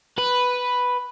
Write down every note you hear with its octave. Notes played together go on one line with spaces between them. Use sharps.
B4